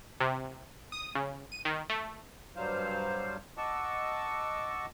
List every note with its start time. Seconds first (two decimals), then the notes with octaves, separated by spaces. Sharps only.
0.20 C3
0.92 D#6
1.15 C#3
1.52 D#7
1.65 D#3
1.89 A3
2.56 G2 F#3 G3 C5 F5
3.58 D#5 F#5 A5 C#6 D6 E6